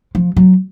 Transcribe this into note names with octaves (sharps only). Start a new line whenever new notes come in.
F3
F#3